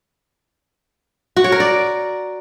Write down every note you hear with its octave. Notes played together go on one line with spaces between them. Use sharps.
F#4
C#5
A#4
D5